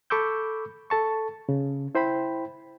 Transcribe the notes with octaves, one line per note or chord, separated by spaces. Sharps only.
A4 B5 C#6 D6 E6 G6
A4 A5 C#6
C#3
E4 C5 G5 B5